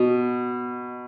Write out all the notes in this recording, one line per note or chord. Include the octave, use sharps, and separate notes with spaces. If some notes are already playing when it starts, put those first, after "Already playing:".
Already playing: B2